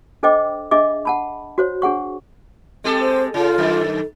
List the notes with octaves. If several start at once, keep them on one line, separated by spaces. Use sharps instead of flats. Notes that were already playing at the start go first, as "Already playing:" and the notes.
D4 A4 C5 D#5 G5 D6
D4 G#4 D#5 E5 D6
F#5 A5 B5
F#4 C5 C#5
D4 G#4 F#5 C#6
G#3 C4 G4 A4
C5
C#3 F4 A4
F#2 D#3